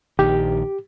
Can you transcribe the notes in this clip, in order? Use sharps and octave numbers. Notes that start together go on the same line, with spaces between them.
A#1 D#3 G4